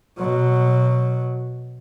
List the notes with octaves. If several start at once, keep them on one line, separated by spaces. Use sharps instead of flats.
B2 F#3